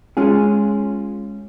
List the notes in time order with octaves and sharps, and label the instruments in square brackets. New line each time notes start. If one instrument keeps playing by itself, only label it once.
[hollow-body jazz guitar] G#3 C#4 F4 G#4